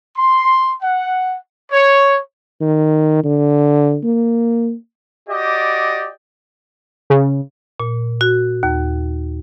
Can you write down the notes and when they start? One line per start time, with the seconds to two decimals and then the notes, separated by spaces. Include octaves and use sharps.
0.16 C6
0.82 F#5
1.72 C#5
2.61 D#3
3.24 D3
4.03 A#3
5.29 F#4 G4 D5 D#5
7.10 C#3
7.80 A#2
8.21 F#4
8.63 D#2